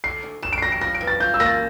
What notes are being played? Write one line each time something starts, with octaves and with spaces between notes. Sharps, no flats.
D3 C7
D2
D2 E7
D7
C7
G3 A#6
D7
F3 A#6
D7
G2
A6
F4 G6
E6
A#3 A#6
A6